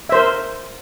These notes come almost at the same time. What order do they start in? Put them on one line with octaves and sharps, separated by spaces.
E5 C5 A#4